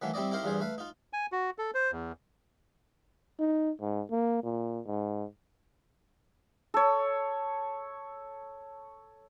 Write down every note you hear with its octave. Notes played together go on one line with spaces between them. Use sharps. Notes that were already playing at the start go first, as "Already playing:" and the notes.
D#3 E3 F#3 A3 A#3
G3 C4 E4 D5 D#5
D#4 E4 G4 A#4 C5 F5
E2 G2 F4 G#4 C5
A3 B4 F5
D#4 F4
G#5
F#4
A4
C5
E2
D#4
G#2
A#3
A#2
G#2
A4 C#5